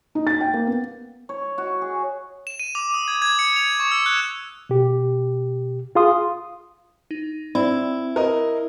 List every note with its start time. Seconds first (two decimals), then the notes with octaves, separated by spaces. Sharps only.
0.15 D#4
0.27 A6
0.41 G5
0.54 A#3
0.67 B3
1.29 C#5
1.58 F#4
1.82 G#4
2.47 E7
2.60 D#7
2.75 D6
2.94 D#6
3.08 G#6
3.22 G#6
3.39 C#7
3.56 F7
3.80 C#6
3.92 E6
4.06 F#6
4.69 B2 G4
5.95 F4 G#4 F5 C6 D#6
7.11 D#4
7.55 C4 E4 D5
8.16 A#4 D#5